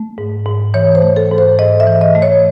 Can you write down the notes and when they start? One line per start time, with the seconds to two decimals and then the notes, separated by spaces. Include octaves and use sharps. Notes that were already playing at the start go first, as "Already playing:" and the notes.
Already playing: A3
0.18 G#2
0.46 G#2
0.74 E3 C#5
0.95 C5
1.02 A3
1.16 A4
1.31 G#2
1.38 C5
1.59 G#2 D#5
1.80 E5
1.87 E3
2.01 D#5
2.15 A3
2.22 C#5